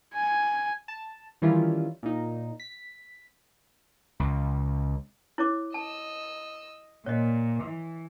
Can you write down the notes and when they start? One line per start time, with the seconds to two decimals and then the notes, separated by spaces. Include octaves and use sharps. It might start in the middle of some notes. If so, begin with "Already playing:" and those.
0.15 G#5
0.88 A5
1.42 D#3 E3 G3 C#4 E4 F4
2.03 A#2 D#4
2.60 B6
4.20 C#2
5.38 E4 C#5 D6
5.74 D#5 A5 E6
7.06 A#2 C#5 D#5
7.63 E3